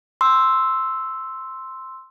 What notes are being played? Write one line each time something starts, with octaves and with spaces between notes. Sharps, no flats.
C6 E6